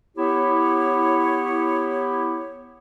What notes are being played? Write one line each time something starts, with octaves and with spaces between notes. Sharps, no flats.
B3 E4 G4 C#5